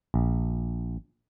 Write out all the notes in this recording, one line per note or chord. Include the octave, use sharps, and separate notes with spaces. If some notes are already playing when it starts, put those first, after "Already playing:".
A#1